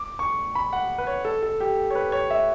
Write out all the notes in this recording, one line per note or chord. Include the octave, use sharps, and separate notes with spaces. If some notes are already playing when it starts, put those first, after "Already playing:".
Already playing: D6
C#6
B5
F#5
B4
C#5
A4
A4
G4
C#5
B4
C#5
E5